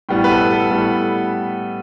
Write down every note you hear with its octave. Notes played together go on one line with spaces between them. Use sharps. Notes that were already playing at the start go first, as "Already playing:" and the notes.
A2 G3 B3 G5
B4
A4
A4
A2 G3 B3 A4